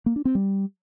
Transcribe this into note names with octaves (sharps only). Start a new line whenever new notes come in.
A#3
D4
C4
G3